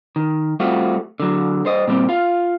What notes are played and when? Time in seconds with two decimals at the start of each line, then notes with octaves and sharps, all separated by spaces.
0.16 D#3
0.60 G3 A3 C4 F4 F#4
1.20 D3 F#3
1.65 G3 C5 D#5
1.88 A#2 G3 C4
2.09 F4 F5